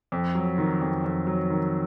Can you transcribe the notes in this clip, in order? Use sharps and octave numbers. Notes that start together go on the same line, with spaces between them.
F2
F#3
D#3
F2
F2
F#3
D#3